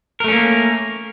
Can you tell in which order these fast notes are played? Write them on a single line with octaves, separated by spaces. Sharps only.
A#4 A3 C#4 A#3